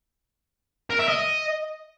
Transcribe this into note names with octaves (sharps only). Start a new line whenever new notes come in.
A#4
E5
D#5